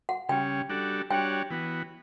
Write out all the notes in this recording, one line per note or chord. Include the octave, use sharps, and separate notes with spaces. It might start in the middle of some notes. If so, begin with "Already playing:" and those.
F#5
C#3 G3 C#4 G5
G3 D4 F#4 A4
G3 D4 F#4 C#5 G5
E3 B3 F#4